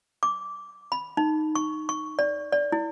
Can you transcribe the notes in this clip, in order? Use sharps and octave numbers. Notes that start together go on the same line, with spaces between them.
D6
B5
D#4
C#6
C#6
D5
D5
E4